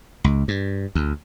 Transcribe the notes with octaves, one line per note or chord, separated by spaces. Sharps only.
C#2
G2
D2